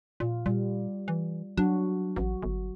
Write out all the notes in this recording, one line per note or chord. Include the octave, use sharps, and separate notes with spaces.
A#2 F4
A#2 G3
E3
F#3 D4 F#4
A1 F#4
G1